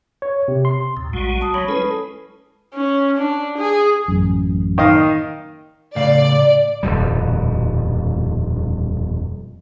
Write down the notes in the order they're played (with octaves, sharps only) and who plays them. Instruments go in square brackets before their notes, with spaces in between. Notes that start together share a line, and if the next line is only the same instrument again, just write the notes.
[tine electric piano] C#5
C3
C6
[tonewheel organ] D#2 A2
[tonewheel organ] A#1 G3 G#3 [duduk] F#4
[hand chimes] A5 D#6
[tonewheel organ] F#3 G3 [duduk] C#5 [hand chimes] B5
[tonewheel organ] G#3 E4 [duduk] C#4 [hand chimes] A4 B4
[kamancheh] C#4
D4
G#4
[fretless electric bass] A1 F#2
[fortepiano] D#3 D#5 F5
[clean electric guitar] A2 C#3 F5 [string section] D5
[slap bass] D#1 F2 B2 G3